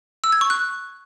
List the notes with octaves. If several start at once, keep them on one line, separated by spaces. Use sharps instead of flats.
E6
G#6
C#6
F#6